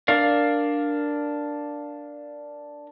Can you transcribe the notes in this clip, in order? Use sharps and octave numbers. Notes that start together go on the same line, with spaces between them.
D4 A#4 D5 F5